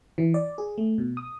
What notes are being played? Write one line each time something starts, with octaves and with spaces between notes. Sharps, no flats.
E3
D5
G#4
A3
B2
D#6